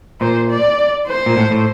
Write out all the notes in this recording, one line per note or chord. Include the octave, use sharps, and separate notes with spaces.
A#2 C5
D5
C5
A#2
A2
A2